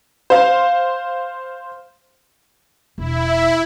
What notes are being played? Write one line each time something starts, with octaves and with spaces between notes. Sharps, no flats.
C5 F5
E1 E4